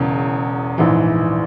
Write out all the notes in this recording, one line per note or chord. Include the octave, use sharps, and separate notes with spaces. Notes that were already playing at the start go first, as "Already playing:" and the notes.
Already playing: E1 E2 C#3
A#1 G#2 E3